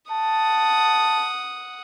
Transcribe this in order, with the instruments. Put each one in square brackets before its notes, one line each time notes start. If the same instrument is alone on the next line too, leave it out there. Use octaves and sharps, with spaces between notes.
[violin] F#5 D#6 [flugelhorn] A5